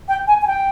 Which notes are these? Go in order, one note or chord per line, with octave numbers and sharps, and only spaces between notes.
G5
G#5
G#5
G5